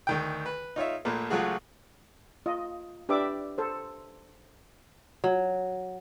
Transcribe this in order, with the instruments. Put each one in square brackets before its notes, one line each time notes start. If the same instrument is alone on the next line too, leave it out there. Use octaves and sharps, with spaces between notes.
[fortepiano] D2 D#3 G5
B4
D#4 F4 C#5 E5
A#1 A#2 A3 A#3
C#2 F#3 A3 F4 F#4 G#4
[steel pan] F4 D#5
D4 G4 B4 D5 E5 D6
A4 C5
[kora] F#3